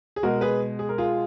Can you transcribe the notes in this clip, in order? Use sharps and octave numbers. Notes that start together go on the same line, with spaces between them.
G#4
B2 G#3 F#4 A#4
G#4 B4
G#4
A#4
F4 G#4